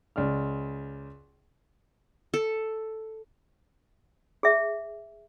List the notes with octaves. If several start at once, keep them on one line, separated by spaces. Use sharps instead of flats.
C#2 D5 F6
A4
G#4 E5